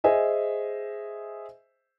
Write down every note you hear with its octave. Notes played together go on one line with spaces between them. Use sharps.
G#4 C5 D#5 E5 G#5